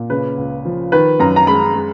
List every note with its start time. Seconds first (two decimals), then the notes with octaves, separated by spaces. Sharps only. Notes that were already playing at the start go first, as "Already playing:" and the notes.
Already playing: A#2
0.10 C#3 B4
0.38 C#2
0.65 F3
0.92 D#3 B4
1.20 F#2 A#5
1.36 A#5
1.47 G#3 B5
1.75 G#3